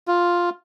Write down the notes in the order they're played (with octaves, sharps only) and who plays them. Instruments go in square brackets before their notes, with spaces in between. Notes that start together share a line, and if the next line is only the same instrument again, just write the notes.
[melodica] F4